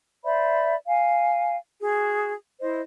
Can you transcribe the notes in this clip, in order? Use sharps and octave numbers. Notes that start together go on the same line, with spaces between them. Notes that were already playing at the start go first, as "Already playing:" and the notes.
C5 D5 E5 B5
F5 G#5
F#4 G#4
E4 C5 D#5